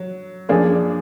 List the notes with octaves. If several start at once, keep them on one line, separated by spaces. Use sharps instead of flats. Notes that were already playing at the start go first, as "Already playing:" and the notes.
Already playing: F#3
F#2 F3 A#3 D4 G#4